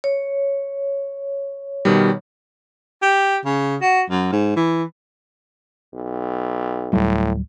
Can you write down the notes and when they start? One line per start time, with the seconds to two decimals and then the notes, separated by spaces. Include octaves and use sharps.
0.04 C#5
1.85 B2 D#3 G3
3.02 G4
3.45 C#3
3.82 F#4
4.10 F#2
4.32 G#2
4.57 E3
5.94 B1
6.93 D1 A2 F#3 G3